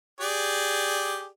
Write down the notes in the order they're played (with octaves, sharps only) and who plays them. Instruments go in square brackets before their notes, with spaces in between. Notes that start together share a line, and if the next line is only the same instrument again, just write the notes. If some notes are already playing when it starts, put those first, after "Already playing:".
[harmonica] G4 G#4 D5